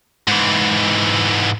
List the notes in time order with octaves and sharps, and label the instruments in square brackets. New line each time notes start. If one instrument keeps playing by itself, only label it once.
[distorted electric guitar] G#2 E3